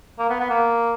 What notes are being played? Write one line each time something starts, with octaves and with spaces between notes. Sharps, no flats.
A#3
B3
B3
A#3